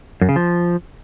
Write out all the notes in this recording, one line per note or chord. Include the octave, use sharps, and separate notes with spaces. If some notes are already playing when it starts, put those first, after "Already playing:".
F#2
C#3
F3